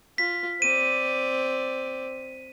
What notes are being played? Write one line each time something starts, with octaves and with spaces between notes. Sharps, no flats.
F4 B6
C4 D5 D#7